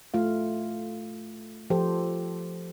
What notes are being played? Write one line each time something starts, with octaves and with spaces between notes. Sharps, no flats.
A3 F4 F5
F3 G4 A4 C5